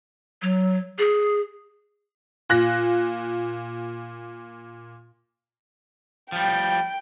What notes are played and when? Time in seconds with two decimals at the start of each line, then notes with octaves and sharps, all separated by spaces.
0.42 F#3
0.99 G#4
2.49 A#2 F#6 A#6
6.32 F3 G3 G5